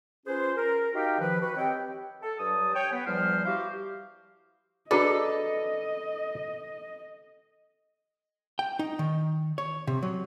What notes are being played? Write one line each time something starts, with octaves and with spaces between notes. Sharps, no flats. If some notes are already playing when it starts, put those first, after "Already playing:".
C#4 F4 G#4 B4 C5
A#4
D#4 F#4 G4 D#5 F5 G5
D#3 F3 B4
F#4 B4
C4 G4 C#5 D#5 G5
A4
G2 F#3 A5 D#6
C#5 G5 G#5
B3 B4
E2 F3 G3 C5 F6
E4 F#4 G4 C5 F5
D4 F#4 G#4 A4 B4 D5 D#5
G5
D#4
D#3
C#5
C3
F#3